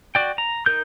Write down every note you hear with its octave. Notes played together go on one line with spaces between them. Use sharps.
F#4 D5 G5
A#5
D#4 A#4 G6